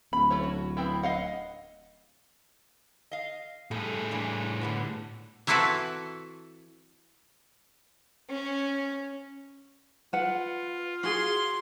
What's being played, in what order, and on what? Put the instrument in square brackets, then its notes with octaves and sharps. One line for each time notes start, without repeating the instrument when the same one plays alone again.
[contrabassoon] D1 [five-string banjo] B5
[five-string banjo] A3 C#4 C#5
F#4
B3 C4 E4
D#5 F5 F#5
[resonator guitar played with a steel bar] D#5 F5
[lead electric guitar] A2 G#4 [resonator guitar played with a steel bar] G3 A3
[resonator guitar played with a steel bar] E3 A#3 D4
D3 G3 B3
[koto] E3 C4 E4 F#4 A4 B4
[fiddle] C#4
[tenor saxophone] F4 [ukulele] B4 F#5
[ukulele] F#4 G#4 [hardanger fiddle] C6